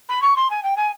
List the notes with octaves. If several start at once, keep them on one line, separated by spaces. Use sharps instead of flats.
B5
C#6
C6
G#5
G5
G#5